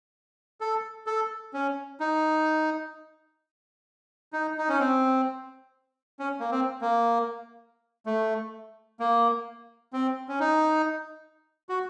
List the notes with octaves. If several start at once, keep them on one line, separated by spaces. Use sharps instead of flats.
A4
A4
C#4
D#4
D#4
D#4
C#4
C4
C#4
A#3
C4
A#3
A3
A#3
C4
C#4
D#4
F#4